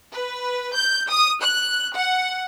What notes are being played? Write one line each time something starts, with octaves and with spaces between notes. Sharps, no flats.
B4
G6
D#6
F#6
F#5